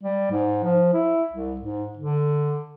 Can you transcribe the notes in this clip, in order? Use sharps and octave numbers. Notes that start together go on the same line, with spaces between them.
G3
G#2
F3
E4
C2
G#2
D3